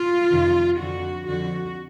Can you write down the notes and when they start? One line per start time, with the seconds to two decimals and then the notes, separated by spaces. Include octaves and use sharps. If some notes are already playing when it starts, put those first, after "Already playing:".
Already playing: F4
0.31 F2 C3 D#3
0.80 F2 D3 F3 F#4
1.27 F2 D3 F3 F#4